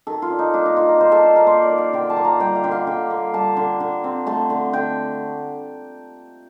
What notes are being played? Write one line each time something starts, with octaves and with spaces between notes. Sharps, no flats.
D#3 A4
F4
D4
D#4
A#3 D4
D#4
D#3 F4
A#4
D#3 C5
A4
D4
A#4
A#3 C5
D5
D#3
F5
D3 G5
A5
A#3
A#5
G3 G5
F5
D3 G5
F5
D3 G5
A#3
G3 A5
D3
D3
C4
A3 A5
D3
D3 G5